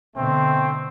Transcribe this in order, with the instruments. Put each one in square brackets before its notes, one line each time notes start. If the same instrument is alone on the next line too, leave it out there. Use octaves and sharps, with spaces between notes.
[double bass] B2 D3 [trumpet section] A3 C4